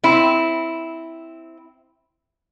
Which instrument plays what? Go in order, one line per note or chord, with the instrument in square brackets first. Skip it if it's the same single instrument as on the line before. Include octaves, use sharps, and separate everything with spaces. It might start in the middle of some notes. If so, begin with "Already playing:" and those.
[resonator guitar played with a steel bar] C4 E4